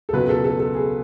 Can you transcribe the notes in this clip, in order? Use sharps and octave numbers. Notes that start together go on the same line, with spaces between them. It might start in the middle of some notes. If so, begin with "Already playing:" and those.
A4
C#2 B2 F#3 B4
A4
A4
A4
G#4